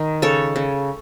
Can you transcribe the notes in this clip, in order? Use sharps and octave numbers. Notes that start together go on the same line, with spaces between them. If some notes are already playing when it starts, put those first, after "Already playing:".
Already playing: D#3
C#3 A4 C#5
C#3